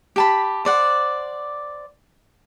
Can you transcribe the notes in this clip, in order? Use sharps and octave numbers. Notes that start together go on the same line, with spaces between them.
G4 A5 B5
C5 D5 F#5